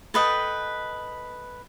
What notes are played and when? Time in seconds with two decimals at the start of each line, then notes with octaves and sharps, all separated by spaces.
0.14 A4 B4 D#5 G5